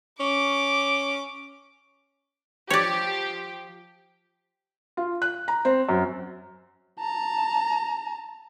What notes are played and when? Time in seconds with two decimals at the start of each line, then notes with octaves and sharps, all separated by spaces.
0.20 C#4 D6
2.70 F3 G4 C#5 D5
4.97 F4
5.22 F#6
5.48 A#5
5.65 C4
5.89 F#2
7.00 A5 A#5